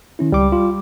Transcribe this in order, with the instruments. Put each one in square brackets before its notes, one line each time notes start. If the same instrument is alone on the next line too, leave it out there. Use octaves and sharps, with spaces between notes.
[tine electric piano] D#3 C#4 E4
[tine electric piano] C#2 [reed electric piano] G3 D6
[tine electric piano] F4